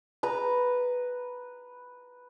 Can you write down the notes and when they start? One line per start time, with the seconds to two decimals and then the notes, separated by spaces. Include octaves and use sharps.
0.23 B4 A#5